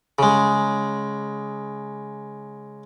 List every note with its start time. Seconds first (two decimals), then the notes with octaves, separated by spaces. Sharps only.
0.19 C#3 G#3